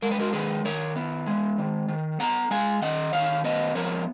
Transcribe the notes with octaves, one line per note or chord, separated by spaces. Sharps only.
G#3 A#4
B4
F#4 A#4
D#3 G#4 B4
D#3 A#4 C#5
B3
G#3
D#3
D#3
B3 F#5 A#5
G#3 F5 G#5
D#3 D#5 F#5
D#3 C#5 F5
B3 B4 D#5
F3 A#4 C#5